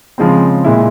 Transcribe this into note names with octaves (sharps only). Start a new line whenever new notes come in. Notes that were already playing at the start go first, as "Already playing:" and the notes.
C#3 F3 G#3 C4
A#2 G#3 E4